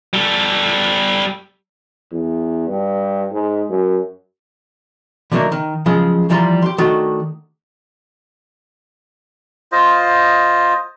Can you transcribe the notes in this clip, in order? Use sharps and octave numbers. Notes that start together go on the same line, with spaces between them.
G3 A4
E2
G2
G#2
F#2
D3 F#3 A3 A#3 D4 D#4
D#3
C#3 F3 F#3 G#3
E3 F3 G3 A#5 C6
G4 C6
D#3 A3 D4 F#4
F4 C5 D#5